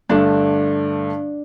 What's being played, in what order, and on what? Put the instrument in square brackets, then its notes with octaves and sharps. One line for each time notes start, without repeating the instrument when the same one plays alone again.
[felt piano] G2 D3 A3 [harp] D4